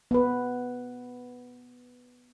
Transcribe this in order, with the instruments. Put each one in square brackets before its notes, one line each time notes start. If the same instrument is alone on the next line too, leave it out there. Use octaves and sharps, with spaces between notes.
[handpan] B3 B4